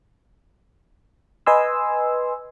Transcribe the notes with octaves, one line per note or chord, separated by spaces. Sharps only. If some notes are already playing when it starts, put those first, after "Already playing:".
B4 D#5 G#5 C6 E6